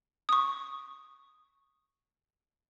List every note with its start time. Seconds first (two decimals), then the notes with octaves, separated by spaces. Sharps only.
0.29 C#6 D#6